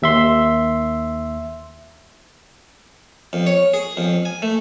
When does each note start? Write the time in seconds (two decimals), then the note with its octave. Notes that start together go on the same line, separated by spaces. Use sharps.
0.02 D#2 E5 C6
3.33 F2
3.47 C#5
3.74 G#4
3.97 F2
4.25 G#5
4.42 A3